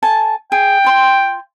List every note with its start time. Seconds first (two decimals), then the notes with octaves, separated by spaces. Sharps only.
0.03 A4 G#5 A5
0.52 G#4 G5
0.84 F4 C6